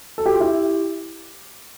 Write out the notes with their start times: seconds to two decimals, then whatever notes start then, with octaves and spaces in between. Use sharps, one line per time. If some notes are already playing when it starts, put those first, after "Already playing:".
0.18 A4
0.26 G4
0.33 F4
0.40 E4 G4